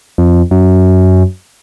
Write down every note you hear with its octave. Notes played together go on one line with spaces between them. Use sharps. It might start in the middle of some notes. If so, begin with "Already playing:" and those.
F2
F#2